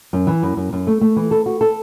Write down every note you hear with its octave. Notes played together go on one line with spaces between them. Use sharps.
F#2
E3
F#2
F#2
F#2
A3
A3
E3
A4
F#4
A4